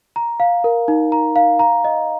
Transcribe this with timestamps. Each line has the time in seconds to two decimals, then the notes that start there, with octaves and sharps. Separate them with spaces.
0.16 A#5
0.40 F5
0.64 A#4
0.88 D#4
1.12 A#5
1.36 F5
1.59 A#5
1.85 D#5